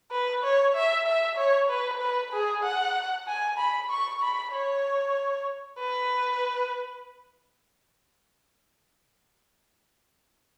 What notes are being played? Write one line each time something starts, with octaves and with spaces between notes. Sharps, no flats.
B4
C#5
E5
E5
C#5
B4
B4
G#4
F#5
G#5
B5
C#6
B5
C#5
B4